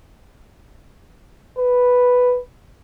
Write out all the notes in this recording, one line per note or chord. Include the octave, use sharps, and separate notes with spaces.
B4